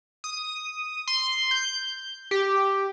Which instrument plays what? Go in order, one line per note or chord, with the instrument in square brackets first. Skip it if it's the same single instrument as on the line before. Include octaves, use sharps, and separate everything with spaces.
[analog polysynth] D#6
C6
G6
G4